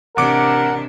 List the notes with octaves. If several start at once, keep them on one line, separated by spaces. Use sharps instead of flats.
A1 C3 D4 A#4 F#5 D6 C#7